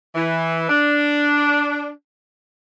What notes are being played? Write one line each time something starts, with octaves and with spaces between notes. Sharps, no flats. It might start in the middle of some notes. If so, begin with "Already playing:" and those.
E3
D4